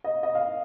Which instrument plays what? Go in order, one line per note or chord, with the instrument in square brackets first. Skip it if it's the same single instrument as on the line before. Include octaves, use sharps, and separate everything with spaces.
[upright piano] D#5
D#5
F5